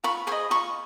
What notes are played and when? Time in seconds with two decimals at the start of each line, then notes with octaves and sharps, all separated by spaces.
0.04 F4 B5 C#6
0.27 G#4 C5 D#5 B5 C#6
0.50 F4 B5 C#6